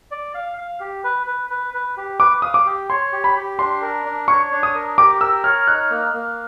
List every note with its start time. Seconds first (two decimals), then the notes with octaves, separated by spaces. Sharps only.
0.11 D5
0.35 F5
0.58 F5
0.80 G4
1.04 B4
1.27 B4
1.50 B4
1.74 B4
1.97 G4
2.20 B4 D6
2.42 F5 D#6
2.54 D6
2.66 G4
2.90 C#5 C6
3.13 G4
3.24 B5
3.36 G4
3.58 D4 C6
3.82 A#4
4.05 D4
4.28 C#5 C#6
4.51 D4
4.63 D#6
4.75 A#4
4.98 G4 D6
5.21 A#4 E6
5.44 C#5 F6
5.67 D#4 F#6
5.90 A#3
6.13 A#3